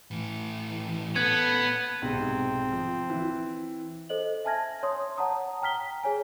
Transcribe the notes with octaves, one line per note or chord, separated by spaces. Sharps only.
A2 E3
B3 C#4 A4 F#6 G#6 C#7
B1 G#2 C3 C4
F3
E3
A4 C5 D#5 F#7
E5 G#5 A5 F6 G#6 A#6
C#5 C6 D#6
C#5 F#5 A5 A#5 D#6
G5 A#5 F6 B6 G7
G#4 C#5 G#5